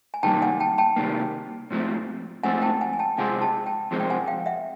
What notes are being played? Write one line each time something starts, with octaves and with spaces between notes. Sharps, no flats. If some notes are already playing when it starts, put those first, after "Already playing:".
G#5
C3 D#3 G3 A#3 G5 A5
F#5 G#5
G5 A5
G5 A5
C3 D#3 G3 A#3
G#2 F3 A3 C4
G#2 F3 A3 C4 F#5 G#5
G5 A5
F#5 G#5
G#5
G5 A5
F2 C3 F3 G#3 C4 F#5 G#5
G5 A5
G5 A5
F2 C3 F3 G#3 C4
G5
F#5 G#5
F5 G5
E5 F#5